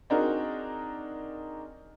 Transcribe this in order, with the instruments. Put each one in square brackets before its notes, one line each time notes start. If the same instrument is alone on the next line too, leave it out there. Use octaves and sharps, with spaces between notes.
[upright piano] C4 D4 D#4 F#4 G#4 A#4